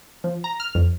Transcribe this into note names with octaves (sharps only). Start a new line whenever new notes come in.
F3
A#5
F6
F2